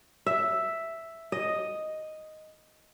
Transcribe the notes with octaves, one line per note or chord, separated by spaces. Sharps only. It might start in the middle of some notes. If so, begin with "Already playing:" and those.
E5
D#5